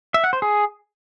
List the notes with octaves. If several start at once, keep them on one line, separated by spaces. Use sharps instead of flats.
E5
F#5
C5
G#4